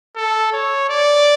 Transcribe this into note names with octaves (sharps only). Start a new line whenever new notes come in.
A4
C#5
D5